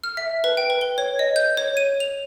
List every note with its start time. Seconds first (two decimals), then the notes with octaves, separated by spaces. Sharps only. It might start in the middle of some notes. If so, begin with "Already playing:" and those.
0.04 F6
0.17 E5
0.44 B4
0.57 G5
0.70 B4
0.81 G7
0.98 C#5
1.19 D#5
1.36 G6
1.57 C#5
1.77 D#7
2.00 F7